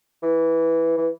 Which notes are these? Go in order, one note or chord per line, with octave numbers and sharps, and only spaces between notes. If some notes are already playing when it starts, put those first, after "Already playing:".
E3
E3